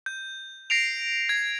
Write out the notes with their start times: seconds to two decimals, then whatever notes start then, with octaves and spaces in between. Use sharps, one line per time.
0.06 G6
0.70 A#6 C7 D7 F7
1.29 G#6